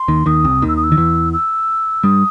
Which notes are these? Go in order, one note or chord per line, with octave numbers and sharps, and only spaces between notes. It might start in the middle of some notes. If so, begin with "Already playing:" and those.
Already playing: C6
D#2 D#3
D#2 D#3 D#6
C2 C3
D#2 D#3
E6
D#6
E6
D#3
E2 E3
E6
G2 G3 D#6